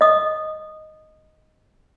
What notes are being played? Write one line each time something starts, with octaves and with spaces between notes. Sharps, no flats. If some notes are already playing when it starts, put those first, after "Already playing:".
D#5 D#6